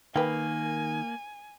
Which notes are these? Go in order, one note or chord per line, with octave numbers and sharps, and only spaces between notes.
D#3 A#3 B4 G5 G#5